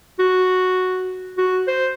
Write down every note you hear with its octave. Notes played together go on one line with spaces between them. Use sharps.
F#4
F#4
C5